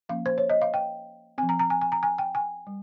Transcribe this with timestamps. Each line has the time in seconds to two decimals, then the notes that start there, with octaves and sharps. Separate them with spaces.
0.09 F3 A#3 C#4 F5
0.26 C5
0.38 C#5
0.50 D#5
0.62 F5
0.74 G5
1.38 F3 C4 G#5
1.49 A#5
1.59 A#5
1.70 G#5
1.81 G#5
1.92 A#5
2.03 G#5
2.18 G5
2.35 G#5
2.67 G3